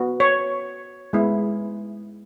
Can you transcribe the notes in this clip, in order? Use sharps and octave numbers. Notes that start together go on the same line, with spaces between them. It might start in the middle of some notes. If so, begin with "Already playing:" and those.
Already playing: B3 F#4
C#5
G#3 B3 E4